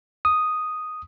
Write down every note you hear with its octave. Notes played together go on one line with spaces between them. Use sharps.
D#6